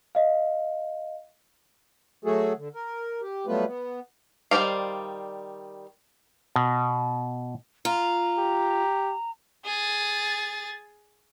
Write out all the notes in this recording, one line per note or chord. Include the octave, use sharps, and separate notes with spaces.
D#5 F5
F#3 A3 F#4 G#4 A4
D3
A#4
G4
F#3 G3 A3 B3 F4 B4
B3
D#3 G3 C5 D5 F5
B2
F4 A#5
G4
G#4 A6